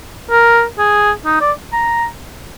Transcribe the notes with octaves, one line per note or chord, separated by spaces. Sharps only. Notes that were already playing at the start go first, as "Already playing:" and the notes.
A#4
G#4
D#4
D5
A#5